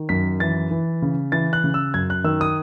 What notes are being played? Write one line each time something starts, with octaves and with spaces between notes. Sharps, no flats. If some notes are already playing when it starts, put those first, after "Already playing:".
Already playing: D#3
F#2 B6
E3 A6
E3
C#3
E3 A6
F#6
C#3
E6
F#2 G#6
F#6
D#3 E6
D#6